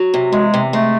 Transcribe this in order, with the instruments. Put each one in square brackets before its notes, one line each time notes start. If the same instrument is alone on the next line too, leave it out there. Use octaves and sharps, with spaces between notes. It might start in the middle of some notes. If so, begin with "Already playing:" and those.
Already playing: [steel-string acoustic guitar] F#3
C3
[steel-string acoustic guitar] E2 [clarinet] G#3
[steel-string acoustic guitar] C3
[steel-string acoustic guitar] G#3 [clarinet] A3